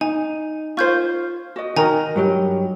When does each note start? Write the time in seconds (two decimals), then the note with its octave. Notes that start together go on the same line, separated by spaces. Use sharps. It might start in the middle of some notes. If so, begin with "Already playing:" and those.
0.01 D#4 G#5
0.77 F4 C5 C#6 G6 G#6
1.56 F#4 D#5
1.76 D#3 F#4 A#4 D#5 G#5 A#5
2.16 G2 F#3 G4